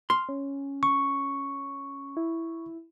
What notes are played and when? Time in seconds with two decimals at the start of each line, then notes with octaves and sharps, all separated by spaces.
0.10 C6 F6
0.29 C#4
0.83 C#6
2.17 E4